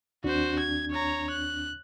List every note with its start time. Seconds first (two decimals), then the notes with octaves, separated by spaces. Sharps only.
0.24 D#2 C4 D4 F#4 C5
0.59 G#6
0.92 C#5 A#5
1.30 F#6